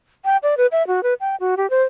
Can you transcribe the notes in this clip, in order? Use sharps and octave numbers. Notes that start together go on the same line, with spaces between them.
G5
D5
B4
E5
F#4
B4
G5
F#4
G4
C5